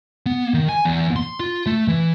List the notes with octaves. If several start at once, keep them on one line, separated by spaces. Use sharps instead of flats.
B3
D#3
G#5
E2
C6
F4
A3
E3